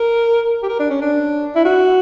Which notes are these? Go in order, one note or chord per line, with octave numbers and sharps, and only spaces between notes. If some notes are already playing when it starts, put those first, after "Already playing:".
Already playing: A#4
G4
A#4
D4
C#4
D4
E4
F#4